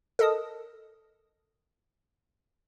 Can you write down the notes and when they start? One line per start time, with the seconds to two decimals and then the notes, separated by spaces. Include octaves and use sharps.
0.19 A4 A#4 D#5 A5 D#6